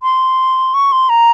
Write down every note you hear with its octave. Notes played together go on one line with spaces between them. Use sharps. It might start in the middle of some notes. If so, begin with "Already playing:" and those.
C6
C#6
C6
A#5